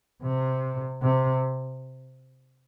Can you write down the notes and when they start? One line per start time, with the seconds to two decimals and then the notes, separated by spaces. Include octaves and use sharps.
0.23 C3
1.02 C3